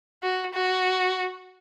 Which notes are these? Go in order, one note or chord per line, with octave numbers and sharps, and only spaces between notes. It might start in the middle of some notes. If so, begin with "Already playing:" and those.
F#4
F#4